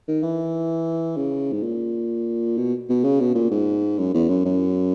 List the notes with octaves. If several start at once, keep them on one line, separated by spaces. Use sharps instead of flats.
D#3
E3
C#3
G#2
A#2
B2
B2
C#3
B2
A#2
G#2
F#2
E2
F#2
F#2